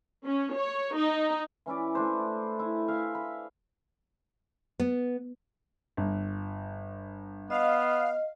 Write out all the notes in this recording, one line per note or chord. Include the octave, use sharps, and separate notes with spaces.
C#4
C#5
D#4
E3 C#4 E4 D5
A3 D4 C5
E4
E5 F5 G#5
B5
B3
G1
B3 D#5 F5